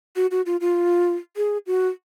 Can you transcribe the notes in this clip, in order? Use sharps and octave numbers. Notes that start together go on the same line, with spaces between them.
F#4
F#4
F4
F4
G#4
F#4